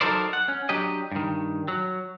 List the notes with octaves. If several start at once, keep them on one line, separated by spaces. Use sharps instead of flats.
F#3 D#4 A4 A#4 C5 D5
F#5
C#4
F#3 D4 G4 D#5
G2 D#3
F#3